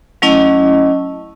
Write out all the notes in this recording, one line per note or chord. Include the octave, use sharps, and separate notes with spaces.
F#3 A3 C#4 E4 D#5